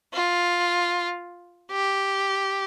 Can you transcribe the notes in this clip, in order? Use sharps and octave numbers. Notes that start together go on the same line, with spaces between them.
F4
G4